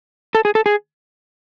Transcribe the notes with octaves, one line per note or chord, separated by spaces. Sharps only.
A4
G#4
A4
G#4